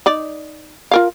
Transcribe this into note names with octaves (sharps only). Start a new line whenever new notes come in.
D#4 D5
F4 A#4 F5